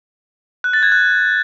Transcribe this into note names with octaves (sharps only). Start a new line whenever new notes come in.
F#6
A6
G#6
F#6